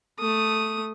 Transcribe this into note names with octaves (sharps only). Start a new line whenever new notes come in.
A3 D#6